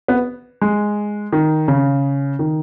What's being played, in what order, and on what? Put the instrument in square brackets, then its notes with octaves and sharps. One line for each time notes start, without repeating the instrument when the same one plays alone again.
[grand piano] B3
G#3
D#3
C#3
D#3